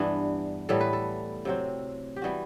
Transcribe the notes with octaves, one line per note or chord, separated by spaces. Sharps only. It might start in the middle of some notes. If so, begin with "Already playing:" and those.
Already playing: G2 E3 B3 D4
A2 E3 G3 B3 A4
B4
A4
C3 F#3 C4
G4
E3 G3 B3 F#4